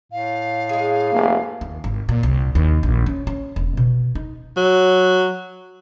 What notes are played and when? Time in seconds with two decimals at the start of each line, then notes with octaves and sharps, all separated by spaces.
0.12 A2 F5
0.69 G#3 G#4
1.13 F1 A#3
1.61 D#2
1.84 G#1
2.09 A#2
2.23 C2
2.55 D#2
2.83 A#1
3.06 C#4
3.27 C#4
3.56 E1
3.77 B2
4.15 D#4
4.57 F#3